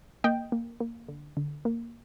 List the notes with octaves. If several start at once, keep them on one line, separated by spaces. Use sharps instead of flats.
A#3 D#5 G5
A#3
A#3
D3
D3
A#3